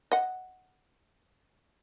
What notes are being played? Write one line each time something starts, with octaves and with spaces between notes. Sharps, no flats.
D#5 F#5